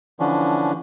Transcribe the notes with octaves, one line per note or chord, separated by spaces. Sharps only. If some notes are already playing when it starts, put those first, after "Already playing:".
D3 E3 F3 C#4 D4